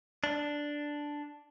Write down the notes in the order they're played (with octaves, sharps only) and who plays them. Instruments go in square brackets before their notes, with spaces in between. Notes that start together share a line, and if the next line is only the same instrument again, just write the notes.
[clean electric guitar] D4